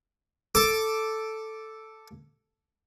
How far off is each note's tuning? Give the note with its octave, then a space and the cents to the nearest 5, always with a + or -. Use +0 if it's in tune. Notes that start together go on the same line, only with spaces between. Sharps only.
A4 +0 D6 +0